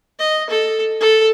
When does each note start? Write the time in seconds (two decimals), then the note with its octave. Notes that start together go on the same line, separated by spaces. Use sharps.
0.19 D#5
0.50 A4
1.00 A4